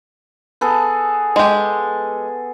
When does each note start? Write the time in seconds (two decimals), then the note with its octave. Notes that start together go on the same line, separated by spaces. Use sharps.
0.61 B3 G#4 A4
1.36 G#3 G4